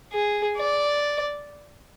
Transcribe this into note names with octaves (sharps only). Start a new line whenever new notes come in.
G#4
D5